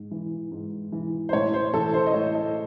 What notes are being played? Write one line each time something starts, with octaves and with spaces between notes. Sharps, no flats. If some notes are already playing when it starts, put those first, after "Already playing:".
Already playing: G#2
E3
G#2
E3
C5
A2 C#5
C5
E3 A4
C5
D#5
A2 C#5
D#5